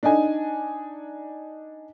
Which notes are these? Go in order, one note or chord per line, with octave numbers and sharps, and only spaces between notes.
D4 D#4 D#5 G#5